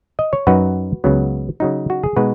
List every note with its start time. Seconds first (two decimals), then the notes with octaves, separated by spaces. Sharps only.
0.19 D#5
0.33 C#5
0.47 F#2 F#3 D#4 F#4 B4
1.04 C#2 C#3 F#3 B3
1.60 C#3 F#3 D#4
1.90 F#4
2.04 G#4
2.16 B2 G#3 D#4 F#4 B4